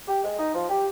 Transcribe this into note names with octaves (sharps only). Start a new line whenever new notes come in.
G4
G#3
D#4
F3
G4